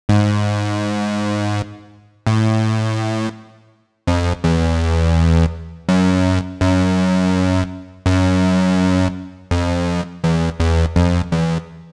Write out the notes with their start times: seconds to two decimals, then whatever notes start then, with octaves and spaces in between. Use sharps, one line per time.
0.09 G#2
2.27 A2
4.07 F2
4.44 E2
5.89 F#2
6.61 F#2
8.06 F#2
9.51 F2
10.24 E2
10.60 E2
10.96 F2
11.32 E2